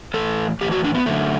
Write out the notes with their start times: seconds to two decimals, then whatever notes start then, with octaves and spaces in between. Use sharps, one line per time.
0.14 A2 E3 A4
0.61 A2 E3 G4
0.72 F#4
0.84 D4
0.95 B3
1.06 F#2 D3 A3